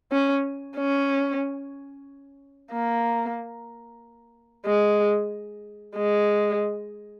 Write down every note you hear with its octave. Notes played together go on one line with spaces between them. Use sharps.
C#4
C#4
A#3
G#3
G#3